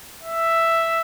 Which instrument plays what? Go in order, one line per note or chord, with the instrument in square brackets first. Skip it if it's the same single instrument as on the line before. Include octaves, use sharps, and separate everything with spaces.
[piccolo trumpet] E5